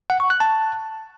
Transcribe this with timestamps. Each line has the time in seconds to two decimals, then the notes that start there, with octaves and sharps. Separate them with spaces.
0.10 F#5
0.20 C#6
0.30 F#6
0.40 A5